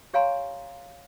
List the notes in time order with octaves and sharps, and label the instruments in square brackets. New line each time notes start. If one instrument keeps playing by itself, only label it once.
[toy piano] G4 C#5 F5 G#5 A#5 C6